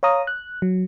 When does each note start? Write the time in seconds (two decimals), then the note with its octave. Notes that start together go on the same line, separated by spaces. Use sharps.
0.03 C#5 F5 A#5 D#6
0.27 F#6
0.62 F#3